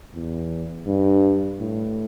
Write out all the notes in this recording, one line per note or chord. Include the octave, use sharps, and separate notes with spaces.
E2
G2
A2